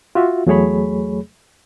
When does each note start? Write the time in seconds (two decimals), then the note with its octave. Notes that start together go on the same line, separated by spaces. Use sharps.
0.15 F4 F#4 E5
0.46 E2 F#3 A3 G#4 C#5 B5